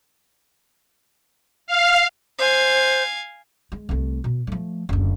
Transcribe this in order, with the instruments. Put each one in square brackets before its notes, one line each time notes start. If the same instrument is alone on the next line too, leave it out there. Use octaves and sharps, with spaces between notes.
[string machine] F5
[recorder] C5 [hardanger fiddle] F5 G#5
[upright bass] G#3
C2 A3
B2
F3 A3
F#1 D2